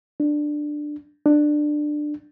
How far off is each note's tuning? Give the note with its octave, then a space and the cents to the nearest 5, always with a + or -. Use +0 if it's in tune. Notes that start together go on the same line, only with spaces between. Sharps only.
D4 +15
D4 +20